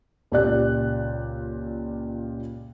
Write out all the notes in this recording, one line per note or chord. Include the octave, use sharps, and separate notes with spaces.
C#2 A#2 G4 D5 F#6